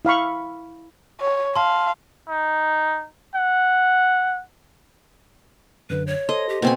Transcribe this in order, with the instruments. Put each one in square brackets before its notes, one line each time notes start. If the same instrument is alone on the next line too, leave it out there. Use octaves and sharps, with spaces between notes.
[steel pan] E4 F5 B5 C#6
[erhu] C#5
[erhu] F5 [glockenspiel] A5 C6
[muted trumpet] D#4
F#5
[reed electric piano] F#2 D3 [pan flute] B4
[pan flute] C#5
[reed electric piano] A4 C5 C6 [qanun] D#5
[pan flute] G4
[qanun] B2 C4 G#5 [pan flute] A#3